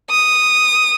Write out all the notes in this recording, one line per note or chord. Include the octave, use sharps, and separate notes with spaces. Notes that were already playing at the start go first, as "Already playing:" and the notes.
D#6